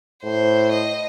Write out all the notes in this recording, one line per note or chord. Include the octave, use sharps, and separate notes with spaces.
A2 C5
D#5